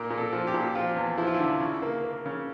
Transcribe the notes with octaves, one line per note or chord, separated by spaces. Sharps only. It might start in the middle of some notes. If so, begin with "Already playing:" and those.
Already playing: A#2 A#4
A#2
A4
F3
G4
A#2
F3 F4
E2
F3 E4
F4
E4
D3
C#3
A#3
A#3
C#3